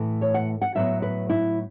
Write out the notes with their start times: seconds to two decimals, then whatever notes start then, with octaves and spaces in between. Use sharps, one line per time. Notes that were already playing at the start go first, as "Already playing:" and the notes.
Already playing: A2 E3 A3
0.21 C#5
0.34 F#5
0.62 F#5
0.75 A2 F#3 B3 E5
1.02 B4
1.30 E4